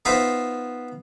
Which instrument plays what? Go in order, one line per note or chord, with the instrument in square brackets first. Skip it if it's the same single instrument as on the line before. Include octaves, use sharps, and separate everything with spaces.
[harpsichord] B3 D#4 F4 C5 E5